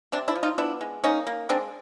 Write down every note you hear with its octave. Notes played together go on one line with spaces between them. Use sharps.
C3 C4 D4
D4 E4
F3
D#4 F4
B3 D4 E4
G#3
A#3 C#4 D#4
A#3
G#3 C4 D4